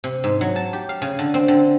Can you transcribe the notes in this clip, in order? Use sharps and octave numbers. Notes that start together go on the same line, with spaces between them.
C3
G#2
F#3
A5
G4
F5
C#3
D3
C4
D3